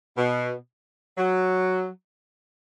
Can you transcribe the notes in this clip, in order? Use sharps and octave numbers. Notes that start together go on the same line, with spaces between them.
B2
F#3